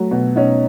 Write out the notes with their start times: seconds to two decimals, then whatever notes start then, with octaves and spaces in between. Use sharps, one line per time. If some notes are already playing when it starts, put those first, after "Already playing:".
Already playing: F#3 A3 F#4
0.11 B2
0.36 B2 C#4 D#4